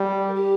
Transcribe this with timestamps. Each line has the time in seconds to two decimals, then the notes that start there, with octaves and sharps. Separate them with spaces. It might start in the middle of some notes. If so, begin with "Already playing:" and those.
Already playing: G3
0.27 A#4
0.34 G4